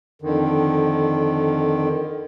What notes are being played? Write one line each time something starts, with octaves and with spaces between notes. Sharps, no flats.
F2 D3 D#3